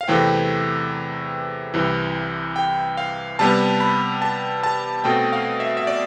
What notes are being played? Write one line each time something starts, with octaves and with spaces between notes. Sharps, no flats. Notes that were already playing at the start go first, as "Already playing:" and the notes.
F5
E2 C3 E3 A3 C4 G5
C2 C3 E3
G5
F5
C3 G3 B3 A5
B5
A5
A5
B2 A3 C4 G5
F5
E5
E5
D5